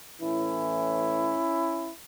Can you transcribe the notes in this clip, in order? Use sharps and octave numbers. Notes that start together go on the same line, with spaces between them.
A2 E3 C#4 E4